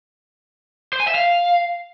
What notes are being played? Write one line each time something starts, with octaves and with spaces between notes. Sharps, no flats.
C5
G#5
E5
F5